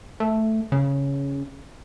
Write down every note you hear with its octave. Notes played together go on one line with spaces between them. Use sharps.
A3
C#3